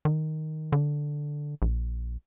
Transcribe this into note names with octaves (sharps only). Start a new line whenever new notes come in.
D#3
D3
A#1